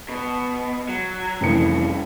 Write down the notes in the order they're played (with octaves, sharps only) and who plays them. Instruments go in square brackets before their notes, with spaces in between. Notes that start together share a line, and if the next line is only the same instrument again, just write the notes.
[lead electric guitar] B2
F#3
[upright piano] F1 E3 C#7 [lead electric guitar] G2 C#3